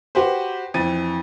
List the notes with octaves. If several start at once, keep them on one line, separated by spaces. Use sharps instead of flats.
F#4 G4 B4 C5
F2 E3 A6 D#7